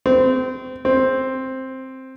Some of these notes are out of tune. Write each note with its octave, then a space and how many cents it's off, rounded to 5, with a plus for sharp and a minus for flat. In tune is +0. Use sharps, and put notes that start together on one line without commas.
C4 -25
C4 +5